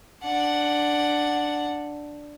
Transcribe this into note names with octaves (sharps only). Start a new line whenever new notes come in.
D4 F#5